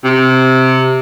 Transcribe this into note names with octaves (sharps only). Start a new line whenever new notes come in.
C3